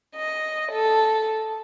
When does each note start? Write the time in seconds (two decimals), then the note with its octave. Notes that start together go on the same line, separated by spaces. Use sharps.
0.16 D#5
0.71 A4